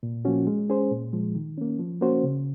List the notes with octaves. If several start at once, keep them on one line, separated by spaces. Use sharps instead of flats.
A#2
F3 A#3 C#4 F#4
G#3
C#4 G#4 C5
A#2
F3 G#3
D#3
A#3 C#4
F3
A#3 C#4 F#4 C5
C#3